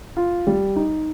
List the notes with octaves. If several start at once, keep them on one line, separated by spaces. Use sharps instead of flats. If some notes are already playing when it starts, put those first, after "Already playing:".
F4
G3
D#4